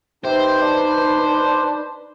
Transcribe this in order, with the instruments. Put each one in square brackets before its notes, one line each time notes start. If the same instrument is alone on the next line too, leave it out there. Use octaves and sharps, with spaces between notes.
[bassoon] C3 [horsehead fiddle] D#4 B4 [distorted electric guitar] C5
[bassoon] D4